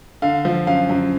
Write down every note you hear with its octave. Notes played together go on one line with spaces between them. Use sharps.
D3 F5
F3
F#2 F5
F#2